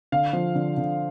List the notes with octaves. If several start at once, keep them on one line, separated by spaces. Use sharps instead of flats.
D3 F5
F3
D3
D3